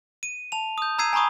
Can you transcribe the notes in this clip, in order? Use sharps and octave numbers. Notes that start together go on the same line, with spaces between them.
D#7
A5 F7
D#6 G6
A#5 E6 G#6 C7 D#7
G#5 A#5 B5 C#6 D#6